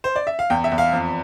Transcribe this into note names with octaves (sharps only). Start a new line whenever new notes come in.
C5
D5
E5
F5
E2 G5
E5
E2
F5
F2